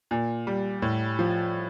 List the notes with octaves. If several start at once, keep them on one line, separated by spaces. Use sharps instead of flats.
A#2
G3
A2
F3